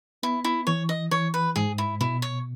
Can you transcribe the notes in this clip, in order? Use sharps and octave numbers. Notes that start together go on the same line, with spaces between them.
B3 E4
E4
E3 C#5
D#5
E3 C#5
B4
G#2 G#4
E4
B2 E4
C#5